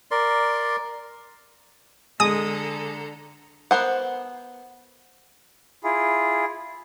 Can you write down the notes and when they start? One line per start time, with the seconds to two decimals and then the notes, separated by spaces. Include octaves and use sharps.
0.11 A#4 D5 C6
2.20 D3 G#3 A4 A#5 D#6
3.71 B3 A#4 C5 F#5
5.84 E4 F4 G#4